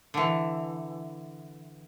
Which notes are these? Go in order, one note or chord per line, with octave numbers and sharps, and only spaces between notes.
D3 E3